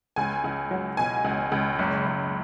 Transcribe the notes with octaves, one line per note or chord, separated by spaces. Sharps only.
C#2 G#5
C#2
F#3
B2 G#5
C#2
C#2
F#1
F#1